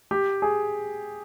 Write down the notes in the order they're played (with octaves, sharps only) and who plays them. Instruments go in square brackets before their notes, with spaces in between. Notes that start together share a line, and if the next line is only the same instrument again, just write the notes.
[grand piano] G4
G#4